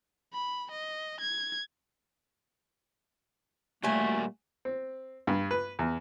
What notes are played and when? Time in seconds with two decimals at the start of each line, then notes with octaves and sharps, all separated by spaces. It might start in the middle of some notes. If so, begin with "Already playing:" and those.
0.33 B5
0.71 D#5
1.20 G#6
3.83 A#2 G3 A3 A#3 F#4 G#5
4.65 C4
5.27 G2
5.51 B4
5.79 E2